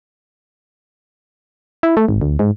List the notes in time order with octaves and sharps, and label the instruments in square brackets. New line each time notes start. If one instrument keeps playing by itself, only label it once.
[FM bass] E4
A3
G#1
D2
G#2